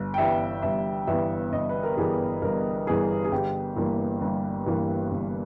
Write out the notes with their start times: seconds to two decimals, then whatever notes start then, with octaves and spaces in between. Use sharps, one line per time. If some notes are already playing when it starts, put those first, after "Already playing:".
Already playing: G1
0.14 G5
0.18 G2 E3 G3 B3 E5
0.62 G1 E5
1.07 G2 E3 G3 B3 E5
1.52 G1 D#5
1.69 B4
1.83 A#4
1.97 G2 E3 G3 B3 G#4
2.42 G1 A#4
2.87 G2 E3 G3 B3 G#4
3.24 G#4
3.32 G1 G4
3.76 G2 E3 A#3
4.21 G1
4.66 G2 E3 A#3
5.11 G1